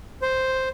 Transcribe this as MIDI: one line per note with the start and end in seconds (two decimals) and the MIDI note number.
0.22 0.69 72